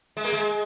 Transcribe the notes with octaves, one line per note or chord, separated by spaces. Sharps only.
G#3
A#3
G#3